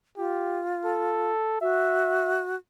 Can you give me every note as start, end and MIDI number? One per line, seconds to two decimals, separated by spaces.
0.18 1.32 65
0.18 0.63 67
0.85 1.59 69
1.61 2.56 66
1.61 2.41 76